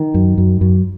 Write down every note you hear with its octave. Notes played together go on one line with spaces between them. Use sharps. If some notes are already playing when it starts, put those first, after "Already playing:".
Already playing: D#3
F#2
F#2
F#2